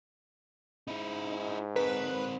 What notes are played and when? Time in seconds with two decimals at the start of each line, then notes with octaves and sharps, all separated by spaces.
0.87 G#2 D#4 E4
1.76 C4 A#4 B4